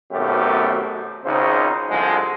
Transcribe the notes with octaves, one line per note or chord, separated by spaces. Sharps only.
G#1 F#2 B2 A3 G4
G#1 C#2 C#3 D#4 C5
C2 D3 F3 G#3